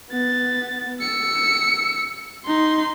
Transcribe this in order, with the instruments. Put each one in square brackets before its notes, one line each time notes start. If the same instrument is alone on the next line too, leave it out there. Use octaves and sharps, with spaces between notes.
[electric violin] B3 A6
E6 C#7
D#4 C6